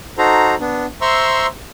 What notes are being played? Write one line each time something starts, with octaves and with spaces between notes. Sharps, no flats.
D#4 F#4 A4 C5 A#5
B3 D4
C5 E5 A#5 C6 C#6 E6